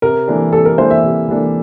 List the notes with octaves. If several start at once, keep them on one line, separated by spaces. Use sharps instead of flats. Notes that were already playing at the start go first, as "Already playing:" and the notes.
C3 A#4
E3 A#3 D4 A4
C3 A4
A#4
E3 A#3 D4 A4 C5
E5
C3
E3 A#3 D4 A4